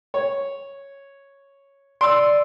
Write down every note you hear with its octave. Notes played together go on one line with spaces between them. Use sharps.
C#5
D5 C6 E6